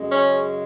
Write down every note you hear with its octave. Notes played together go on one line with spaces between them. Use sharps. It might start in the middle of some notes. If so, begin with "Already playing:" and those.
Already playing: F#2 C#3 G#3
C#4